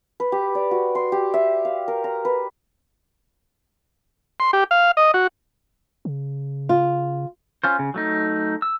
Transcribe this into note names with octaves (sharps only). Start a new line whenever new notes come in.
B4
G4
D5
F#4
C6
G4
E5
F5
A#4
A#5
B4
C6
G4
F5
D#5
F#4
C#3
F4
C#4 F4 C5
C#3
F#3 A3 D#4
E6